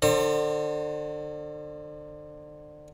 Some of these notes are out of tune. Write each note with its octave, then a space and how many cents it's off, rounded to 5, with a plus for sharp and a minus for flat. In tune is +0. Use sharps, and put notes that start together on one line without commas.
D3 +30 C5 +40 A#5 -40